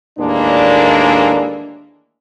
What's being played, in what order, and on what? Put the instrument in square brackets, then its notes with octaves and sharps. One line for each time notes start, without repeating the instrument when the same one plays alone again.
[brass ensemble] D#2 A2 E3 G#3 A#3 D4